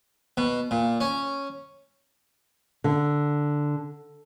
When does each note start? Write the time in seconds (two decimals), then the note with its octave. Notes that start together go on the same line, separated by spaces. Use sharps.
0.37 B2
0.71 A#2
1.00 C#4
2.84 D3